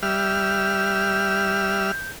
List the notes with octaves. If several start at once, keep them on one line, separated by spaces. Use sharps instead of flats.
G3 E5 F6 G6